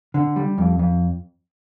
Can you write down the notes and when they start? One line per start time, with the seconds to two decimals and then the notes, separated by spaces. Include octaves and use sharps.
0.14 D3
0.36 G3
0.58 F2
0.79 F2